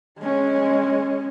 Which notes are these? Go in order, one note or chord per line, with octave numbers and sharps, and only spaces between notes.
G#3 C#4